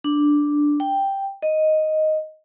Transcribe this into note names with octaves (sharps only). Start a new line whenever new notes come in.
D4
G5
D#5